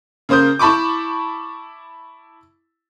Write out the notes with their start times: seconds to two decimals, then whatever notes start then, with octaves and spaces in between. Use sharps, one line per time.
0.29 C#3 A#3 C5 D#6 G6
0.59 E4 A5 B5 C#6 D6